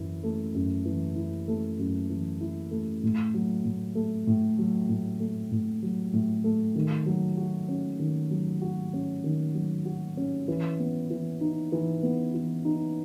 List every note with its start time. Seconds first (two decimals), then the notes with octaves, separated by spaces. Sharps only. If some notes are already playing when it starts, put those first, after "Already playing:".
Already playing: F#2 E3 E4
0.23 A3
0.55 F#2
0.85 E3
1.16 E4
1.48 A3
1.79 F#2
2.09 E3
2.41 E4
2.71 A3
3.03 A2
3.34 F#3
3.65 A2
3.95 A3
4.27 A2
4.59 F#3
4.89 A2
5.20 A3
5.51 A2
5.83 F#3
6.13 A2
6.44 A3
6.76 D#3
7.06 F#3
7.37 F#4
7.69 C#4
7.99 D#3
8.31 F#3
8.62 F#4
8.93 C#4
9.24 D#3
9.55 F#3
9.85 F#4
10.17 C#4
10.48 E3
10.79 B3
11.10 E3
11.41 D#4
11.72 E3
12.03 B3
12.34 E3
12.65 D#4